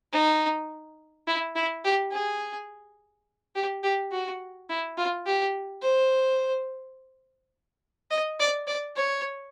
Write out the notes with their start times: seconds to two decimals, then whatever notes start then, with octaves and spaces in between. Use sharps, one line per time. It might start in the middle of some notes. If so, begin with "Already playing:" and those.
0.13 D#4
1.28 E4
1.55 E4
1.85 G4
2.12 G#4
3.55 G4
3.83 G4
4.12 F#4
4.69 E4
4.98 F4
5.26 G4
5.82 C5
8.11 D#5
8.40 D5
8.67 D5
8.96 C#5